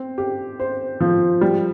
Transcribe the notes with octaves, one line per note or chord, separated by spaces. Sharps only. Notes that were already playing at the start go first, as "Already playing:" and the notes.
Already playing: C4
G4
C5
F3
G3